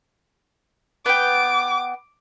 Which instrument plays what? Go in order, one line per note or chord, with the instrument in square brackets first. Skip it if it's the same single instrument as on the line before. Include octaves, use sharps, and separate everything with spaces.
[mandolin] B3 G5 [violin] D6